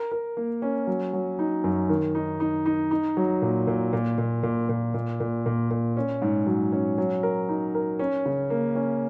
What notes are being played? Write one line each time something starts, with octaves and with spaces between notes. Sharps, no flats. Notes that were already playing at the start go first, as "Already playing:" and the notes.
Already playing: A#4
A#4
A#3
C#4
F#3
F#3
D#4
F#2
D#3
D#4
D#4
D#4
D#4
F#3
A#2
A#2
A#2
A#2
A#2
A#2
A#2
A#2
A#2
A#2
C#4
G#2
F#3
C#4
F#3
A#4
D#4
A#4
C#4
C#3
A#3
C#4